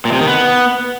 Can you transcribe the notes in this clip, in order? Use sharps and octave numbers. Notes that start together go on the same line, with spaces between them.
A#2
C3
D#3
B3